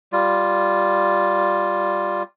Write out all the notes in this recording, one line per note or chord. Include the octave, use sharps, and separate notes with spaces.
G3 F4